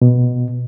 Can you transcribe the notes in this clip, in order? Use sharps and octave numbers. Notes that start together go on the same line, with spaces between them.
B2